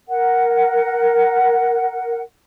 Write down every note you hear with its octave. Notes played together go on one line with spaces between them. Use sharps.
A#4 F#5